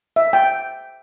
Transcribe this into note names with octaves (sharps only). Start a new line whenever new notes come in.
E5
G5